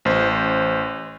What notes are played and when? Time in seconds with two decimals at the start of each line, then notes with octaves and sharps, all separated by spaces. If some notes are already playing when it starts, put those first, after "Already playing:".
0.05 A1 C5